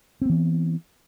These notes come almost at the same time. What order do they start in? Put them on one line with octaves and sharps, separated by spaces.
C4 B3 E3